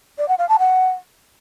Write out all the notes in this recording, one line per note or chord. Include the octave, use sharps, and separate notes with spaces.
D5
F#5
F5
A5
F#5